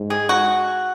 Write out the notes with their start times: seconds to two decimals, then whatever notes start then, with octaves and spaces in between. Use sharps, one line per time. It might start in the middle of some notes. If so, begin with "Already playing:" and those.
Already playing: G#2
0.10 G#4
0.29 F#4